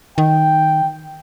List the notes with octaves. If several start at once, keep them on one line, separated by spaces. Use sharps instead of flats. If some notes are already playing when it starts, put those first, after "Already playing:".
D#3 G5